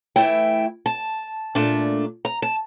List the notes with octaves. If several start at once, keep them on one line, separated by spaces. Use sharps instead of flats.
E3 A3 E4 G5
A5
A#2 A3 D4
A#5
A5